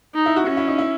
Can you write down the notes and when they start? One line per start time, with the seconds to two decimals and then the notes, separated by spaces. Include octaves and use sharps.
0.15 D#4
0.26 E4
0.36 F#4
0.47 C#4 F#4
0.57 E4
0.68 D#4
0.78 E4